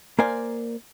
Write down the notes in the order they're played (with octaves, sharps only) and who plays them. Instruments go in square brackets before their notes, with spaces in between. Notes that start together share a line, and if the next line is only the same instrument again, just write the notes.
[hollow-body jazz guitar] A#3 A#4 C5 D5 G#5